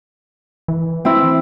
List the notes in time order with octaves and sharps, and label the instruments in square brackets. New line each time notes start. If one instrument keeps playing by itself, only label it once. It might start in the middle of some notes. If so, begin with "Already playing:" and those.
[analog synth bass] E3
[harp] C4 E4